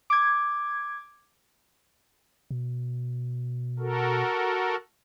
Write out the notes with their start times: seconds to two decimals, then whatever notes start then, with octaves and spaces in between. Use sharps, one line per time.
0.10 D6 G#6
2.51 B2
3.79 F#4 A4 A#4